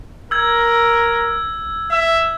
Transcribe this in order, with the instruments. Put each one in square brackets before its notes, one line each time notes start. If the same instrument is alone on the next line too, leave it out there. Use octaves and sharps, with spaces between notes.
[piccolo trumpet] A#4 [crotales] E6 G#6
[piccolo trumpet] E5